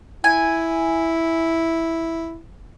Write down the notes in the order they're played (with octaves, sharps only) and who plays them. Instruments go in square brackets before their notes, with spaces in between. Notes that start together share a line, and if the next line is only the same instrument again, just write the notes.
[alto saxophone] E4 [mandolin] G#5